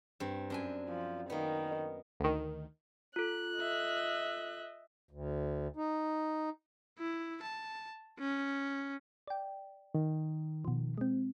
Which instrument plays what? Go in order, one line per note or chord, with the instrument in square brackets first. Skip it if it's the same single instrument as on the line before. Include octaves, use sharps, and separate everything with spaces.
[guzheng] G2 C4
F#2 D4 G#5
[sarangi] F3
[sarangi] D#3 [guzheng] A#3 B3
[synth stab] D2 D#3
[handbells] F4 A4 [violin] F#6
[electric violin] D#5 E5
[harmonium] D2
D#4
[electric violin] E4
A5
C#4
[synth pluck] D5 G5
[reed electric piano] D#3
[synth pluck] B2 F3
G#3 C4